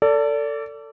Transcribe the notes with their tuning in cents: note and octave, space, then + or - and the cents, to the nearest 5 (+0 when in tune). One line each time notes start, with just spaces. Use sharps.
A4 +25 D5 -25